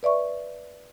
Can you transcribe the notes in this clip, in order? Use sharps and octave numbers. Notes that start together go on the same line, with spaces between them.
B4 D5 E5 C#6